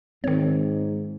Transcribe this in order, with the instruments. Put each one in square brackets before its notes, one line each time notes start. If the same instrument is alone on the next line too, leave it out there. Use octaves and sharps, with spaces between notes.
[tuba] G#2 [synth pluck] D#3 C#5 [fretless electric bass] C4